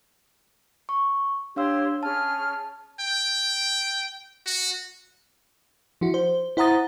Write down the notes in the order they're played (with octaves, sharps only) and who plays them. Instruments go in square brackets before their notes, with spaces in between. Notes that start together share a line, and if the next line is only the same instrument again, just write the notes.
[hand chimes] C#6
[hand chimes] D4 F5 E6 [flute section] G4 C#5 C6
[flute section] C#4 G#4 F6 [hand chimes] A5
[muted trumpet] G5
F#4
[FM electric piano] F3 E4 F#4
C5
E4 C5 F#5 A#5 D#6 A6